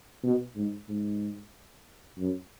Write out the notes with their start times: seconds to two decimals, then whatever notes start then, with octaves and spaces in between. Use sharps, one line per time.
0.23 B2
0.56 G#2
0.89 G#2
2.18 F#2